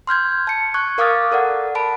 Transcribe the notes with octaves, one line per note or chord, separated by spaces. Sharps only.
C6 F6 G6 G#6
A5 C#7
C#6 F#6 G#6
A#4 F5 D6 D#6 F6 A6
A4 A#4 D5 F#5
F#5 A5 B5 D7